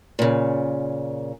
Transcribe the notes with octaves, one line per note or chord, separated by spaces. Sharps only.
A#2 C#3